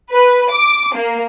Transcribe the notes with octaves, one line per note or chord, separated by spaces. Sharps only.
B4
D6
A#3